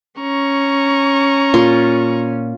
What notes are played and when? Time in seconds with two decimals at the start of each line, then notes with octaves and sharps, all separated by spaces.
0.20 C#4 A#5 C#6
1.54 A#2 F4